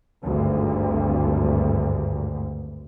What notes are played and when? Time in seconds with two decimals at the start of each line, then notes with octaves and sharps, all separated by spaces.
0.22 G#1 D2 G2